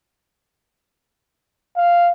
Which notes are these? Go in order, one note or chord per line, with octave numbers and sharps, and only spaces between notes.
F5